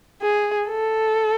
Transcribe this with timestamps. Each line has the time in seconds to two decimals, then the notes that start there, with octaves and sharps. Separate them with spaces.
0.21 G#4
0.68 A4